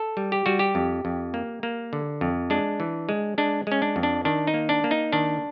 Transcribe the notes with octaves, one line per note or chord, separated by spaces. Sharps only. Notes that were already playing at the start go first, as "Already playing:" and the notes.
Already playing: A4
G3
G4
G3 F#4
G4
F2
F2
A#3
A#3
D3
F2
G#3 D4
E3
G#3
G#3 D4
G#3 C#4
D4
F2
D4
D#3 D4
D#4
A#3
D4
A#3
D#4
D#3 D4